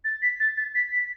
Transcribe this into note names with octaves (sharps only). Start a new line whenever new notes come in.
A6
B6
A6
A6
B6
B6